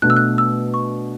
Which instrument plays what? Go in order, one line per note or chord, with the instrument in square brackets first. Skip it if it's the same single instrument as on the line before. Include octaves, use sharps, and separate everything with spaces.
[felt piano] B2 A3 D4 F#4 [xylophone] F#6
[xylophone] E6
F#6
E6
C#6